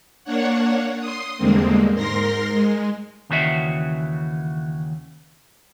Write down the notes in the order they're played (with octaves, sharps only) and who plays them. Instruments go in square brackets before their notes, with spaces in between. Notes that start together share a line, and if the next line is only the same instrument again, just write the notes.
[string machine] A#3 D4 C#5 F#5
C6 D#6
E2 G2 D3 G#3 A#3 C4
G#2 A#4 C6 A#6
G#3
[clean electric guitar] D#2 C#3 E3 F#4 C5 E5